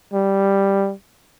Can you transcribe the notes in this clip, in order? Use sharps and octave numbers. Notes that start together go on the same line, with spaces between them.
G3